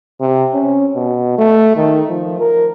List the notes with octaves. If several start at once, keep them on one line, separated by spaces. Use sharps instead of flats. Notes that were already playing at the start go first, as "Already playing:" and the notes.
C3
C#4
B2
A3
D#3
F3
A#4